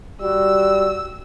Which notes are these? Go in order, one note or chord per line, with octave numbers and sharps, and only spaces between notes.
G3 F#4 E6